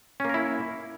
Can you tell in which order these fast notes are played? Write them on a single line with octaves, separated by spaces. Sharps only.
C#4 A#3 A#4 E4